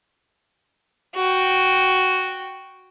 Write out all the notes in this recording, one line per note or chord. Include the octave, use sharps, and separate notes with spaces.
F#4 G5